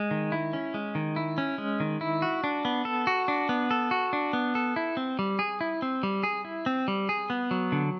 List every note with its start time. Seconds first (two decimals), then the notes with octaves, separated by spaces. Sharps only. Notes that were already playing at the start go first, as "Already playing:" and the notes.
Already playing: G#3
0.11 D#3
0.32 E4
0.53 C#4
0.74 G#3
0.95 D#3
1.16 E4
1.38 C#4
1.58 G#3
1.80 D#3
2.01 E4
2.22 F#4
2.44 D4
2.65 B3
2.85 A4
3.07 F#4
3.28 D4
3.49 B3
3.71 A4
3.91 F#4
4.13 D4
4.33 B3
4.55 A4
4.76 E4
4.97 C4
5.19 G3
5.39 G#4
5.61 E4
5.82 C4
6.03 G3
6.23 G#4
6.45 E4
6.66 C4
6.88 G3
7.09 G#4
7.30 B3
7.51 F#3
7.72 D3